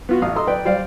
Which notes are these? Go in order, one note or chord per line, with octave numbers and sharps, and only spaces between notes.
B3 F4 F#4
A1 F5 D#6
A4 D#5 A#5 C6 D#6
B4 D5 G5
G3 C5 D5 F5